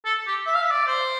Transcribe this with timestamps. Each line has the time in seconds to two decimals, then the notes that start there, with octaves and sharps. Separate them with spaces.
0.05 A4
0.27 G4
0.46 E5
0.55 F5
0.62 E5
0.71 D5
0.87 C5